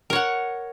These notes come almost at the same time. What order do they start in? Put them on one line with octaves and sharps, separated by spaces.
A#4 C#5 F#5